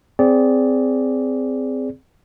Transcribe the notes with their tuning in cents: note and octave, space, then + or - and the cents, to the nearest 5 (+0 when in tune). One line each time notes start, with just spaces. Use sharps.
C4 -15 G#4 +0 D5 -20